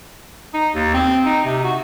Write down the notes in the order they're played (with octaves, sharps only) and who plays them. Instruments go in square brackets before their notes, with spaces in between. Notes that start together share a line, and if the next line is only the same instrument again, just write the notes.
[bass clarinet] D#4
D#2
C4
D#4
C3
F#4